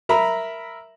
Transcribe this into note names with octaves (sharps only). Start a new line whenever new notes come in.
A#4 E5 A#5 B5